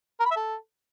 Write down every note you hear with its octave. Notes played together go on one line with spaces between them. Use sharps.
A#4
B5
E5
A4